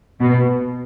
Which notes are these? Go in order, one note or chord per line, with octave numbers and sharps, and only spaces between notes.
B2